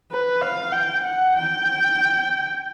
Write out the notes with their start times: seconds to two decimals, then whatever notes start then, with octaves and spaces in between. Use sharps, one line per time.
0.11 B4
0.42 F5
0.72 G5
1.04 F#5
1.36 G5